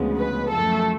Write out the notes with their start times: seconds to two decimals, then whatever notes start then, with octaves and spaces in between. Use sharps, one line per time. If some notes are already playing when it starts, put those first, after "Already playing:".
Already playing: D2 C#3 F3 G#3 B3
0.17 B4
0.51 F#2 F3 A3 A4